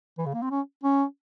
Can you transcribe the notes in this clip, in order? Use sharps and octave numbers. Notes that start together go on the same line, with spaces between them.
E3
C#3
A#3
C4
C#4
C#4